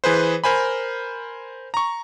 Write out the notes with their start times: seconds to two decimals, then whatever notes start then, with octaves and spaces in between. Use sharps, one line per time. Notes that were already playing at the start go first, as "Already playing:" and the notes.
0.04 E3 G#4 B4 C5
0.44 A#4 C5 G#5 B5
1.74 A#5 C#6